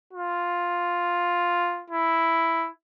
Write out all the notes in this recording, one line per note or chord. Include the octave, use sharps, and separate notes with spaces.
F4
E4